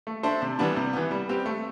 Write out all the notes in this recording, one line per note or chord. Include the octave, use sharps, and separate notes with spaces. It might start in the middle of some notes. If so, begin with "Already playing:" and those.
A3
D4 A4 C5 E5
C3
E3 G3 B3 D4
C3
E3 B3
G3
C4 G4 B4
A3